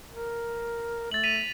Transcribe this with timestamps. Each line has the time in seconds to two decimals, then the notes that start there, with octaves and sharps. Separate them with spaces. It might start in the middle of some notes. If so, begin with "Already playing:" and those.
0.12 A#4
1.12 A3 A6 F#7
1.23 B6 D#7 F7